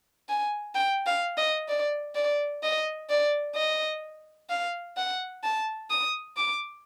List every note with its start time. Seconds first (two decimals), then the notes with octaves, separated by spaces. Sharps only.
0.29 G#5
0.75 G5
1.06 F5
1.37 D#5
1.69 D5
2.15 D5
2.63 D#5
3.09 D5
3.56 D#5
4.49 F5
4.97 F#5
5.43 A5
5.91 D#6
6.37 D6